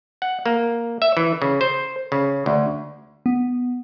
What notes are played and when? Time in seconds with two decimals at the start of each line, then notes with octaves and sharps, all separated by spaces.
0.22 F#5
0.46 A#3
1.02 E5
1.17 E3
1.42 C#3
1.61 C5
2.12 C#3
2.46 D2
3.26 B3